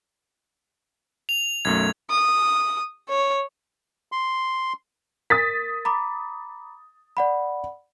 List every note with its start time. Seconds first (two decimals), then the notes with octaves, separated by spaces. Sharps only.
1.29 F7
1.65 B1 F#2 A3 G#6
2.10 D#6
3.09 C#5
4.12 C6
5.30 A#4 D#6 A6 B6
5.85 A#5 B5 D6
7.17 D5 F#5 B5